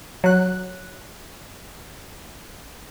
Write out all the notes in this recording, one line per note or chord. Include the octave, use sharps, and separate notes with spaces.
F#3 F#6